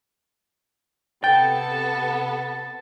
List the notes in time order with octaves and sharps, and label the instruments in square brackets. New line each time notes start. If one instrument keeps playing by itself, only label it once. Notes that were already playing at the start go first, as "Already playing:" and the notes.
[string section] C3 A4 [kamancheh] B3 [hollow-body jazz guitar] G5 [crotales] A6